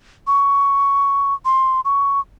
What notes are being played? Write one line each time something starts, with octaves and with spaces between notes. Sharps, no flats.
C#6
C6
C#6